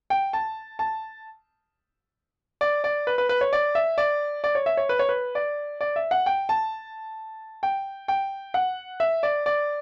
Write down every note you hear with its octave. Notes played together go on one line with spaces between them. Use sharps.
G5
A5
A5
D5
D5
B4
B4
B4
C#5
D5
E5
D5
D5
C#5
E5
C#5
B4
C#5
B4
D5
D5
E5
F#5
G5
A5
G5
G5
F#5
E5
D5
D5